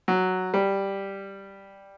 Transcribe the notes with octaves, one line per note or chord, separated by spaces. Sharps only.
F#3
G3